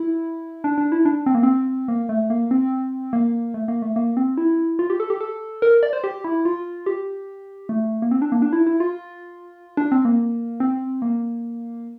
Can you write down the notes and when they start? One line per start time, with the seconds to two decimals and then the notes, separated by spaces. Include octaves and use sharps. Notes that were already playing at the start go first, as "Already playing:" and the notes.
Already playing: E4
0.64 D4
0.78 D4
0.92 E4
1.05 D4
1.26 C4
1.35 A#3
1.43 C4
1.88 A#3
2.09 A3
2.30 A#3
2.51 C4
3.13 A#3
3.54 A3
3.68 A#3
3.82 A3
3.96 A#3
4.17 C4
4.38 E4
4.79 F4
4.90 G4
5.00 A4
5.10 G4
5.21 A4
5.62 A#4
5.83 D5
5.93 C5
6.04 G4
6.24 E4
6.45 F4
6.86 G4
7.69 A3
8.02 A#3
8.11 C4
8.22 D4
8.32 A#3
8.42 D4
8.53 E4
8.67 E4
8.80 F4
9.77 D4
9.92 C4
10.05 A#3
10.60 C4
11.02 A#3